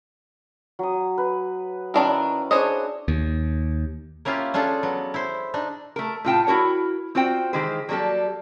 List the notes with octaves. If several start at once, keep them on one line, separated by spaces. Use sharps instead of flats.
F#3 D#6
B4
D#3 C#4 D4 E4 A#4 A5
D4 G#4 C5 C#5 D#5
D#2
A#3 C#4 E4 F4 G4
C#4 D4 F4 G#4 A4
F#3 B3
E4 C5
D4 D#4
A3 A#4
A2 F4 G5 A5
E4 F#4 A#4 C#5
C4 F4 F#4 C5 G5
D#3 E3 G#3 G4 C5
F#3 G3 A#3 G4 A4